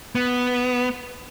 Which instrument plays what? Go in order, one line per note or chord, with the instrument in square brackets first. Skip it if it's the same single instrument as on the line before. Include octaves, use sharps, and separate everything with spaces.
[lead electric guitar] B3